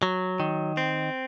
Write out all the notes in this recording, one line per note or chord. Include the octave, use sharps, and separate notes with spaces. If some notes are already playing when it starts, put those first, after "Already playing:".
F#3
D#3
C4